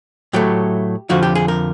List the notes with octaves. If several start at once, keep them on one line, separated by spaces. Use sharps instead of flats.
A2 F#3 A3 G4
F2 D3 F3 F#4
G4
G#4
A#4